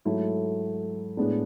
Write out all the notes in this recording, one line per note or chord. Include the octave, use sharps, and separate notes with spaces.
G#2 F#3 A3 E4
A2 G#3 B3 D4